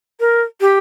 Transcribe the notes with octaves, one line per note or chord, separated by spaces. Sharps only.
A#4
G4